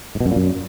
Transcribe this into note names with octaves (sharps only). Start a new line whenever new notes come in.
G#2
B2
F#2
A#2
F#2